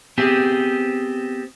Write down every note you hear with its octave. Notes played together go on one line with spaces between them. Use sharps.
B3 C4 G4 G#4